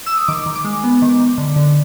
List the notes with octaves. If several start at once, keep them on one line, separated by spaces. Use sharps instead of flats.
E6
D#6
D#3 D6
D#3
D6
G#3
B3
D#3
D#3
D3
D3